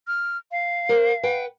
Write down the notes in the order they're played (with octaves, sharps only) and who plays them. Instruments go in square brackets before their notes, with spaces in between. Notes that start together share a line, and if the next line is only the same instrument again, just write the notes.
[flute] F6
F5
[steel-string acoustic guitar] A#4 C5
B4 F#5 G5